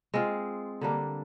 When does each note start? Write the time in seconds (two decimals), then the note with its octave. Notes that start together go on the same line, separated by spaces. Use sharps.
0.14 G#3 C4 F4
0.81 D3 G3 A#3 D4